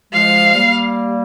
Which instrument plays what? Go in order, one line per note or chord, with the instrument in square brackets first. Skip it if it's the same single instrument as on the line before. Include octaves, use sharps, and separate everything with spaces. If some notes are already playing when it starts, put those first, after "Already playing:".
[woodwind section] F3 G#3 [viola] F5
[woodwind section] G3 A#3